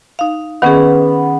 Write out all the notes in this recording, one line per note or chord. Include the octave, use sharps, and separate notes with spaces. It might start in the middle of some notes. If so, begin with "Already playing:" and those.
D#4 F5
D#3 B3 C#4 G#4